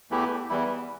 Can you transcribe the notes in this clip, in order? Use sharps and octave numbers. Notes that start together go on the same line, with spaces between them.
E2 E3 A3 E4 G4
E2 E3 G3 E4